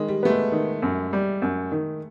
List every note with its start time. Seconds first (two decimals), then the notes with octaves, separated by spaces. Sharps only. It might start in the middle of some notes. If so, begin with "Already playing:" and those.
Already playing: D#3 G#3
0.08 G3
0.23 A3 B3
0.30 G#3
0.52 D#3
0.82 F#2
1.13 G3
1.42 F#2
1.72 D#3